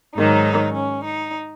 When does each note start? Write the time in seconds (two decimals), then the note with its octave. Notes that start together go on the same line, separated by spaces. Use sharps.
0.15 G#2 D#3 F#3 D#4
0.74 C#4
1.04 D#4